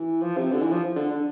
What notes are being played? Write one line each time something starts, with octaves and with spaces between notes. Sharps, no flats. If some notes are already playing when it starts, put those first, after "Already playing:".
Already playing: E3
F3
C3
D3
E3
F3
D3
D3